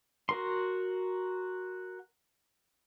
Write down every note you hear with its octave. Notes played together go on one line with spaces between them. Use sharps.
F#4 A#4 C6